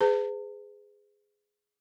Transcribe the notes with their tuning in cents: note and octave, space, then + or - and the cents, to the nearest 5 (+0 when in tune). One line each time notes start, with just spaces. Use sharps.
G#4 +0 B4 +40 A5 +40